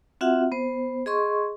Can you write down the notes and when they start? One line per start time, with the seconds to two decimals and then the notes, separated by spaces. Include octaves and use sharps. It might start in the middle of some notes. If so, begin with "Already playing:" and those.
0.21 C4 F4 F#4 E5 F#5
0.52 B3 C5
1.06 G#4 D#5 C6 C#6